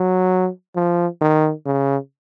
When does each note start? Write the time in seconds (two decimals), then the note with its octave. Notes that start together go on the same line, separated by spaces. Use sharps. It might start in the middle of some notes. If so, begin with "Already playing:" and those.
Already playing: F#3
0.76 F3
1.21 D#3
1.66 C#3